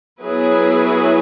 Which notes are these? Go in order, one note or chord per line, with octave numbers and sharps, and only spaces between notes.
F#3 B3 E4 G#4 B4